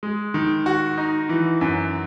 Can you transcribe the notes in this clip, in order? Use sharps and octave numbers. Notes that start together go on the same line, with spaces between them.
G#3
D#3
F#4
D#4
E3
F#2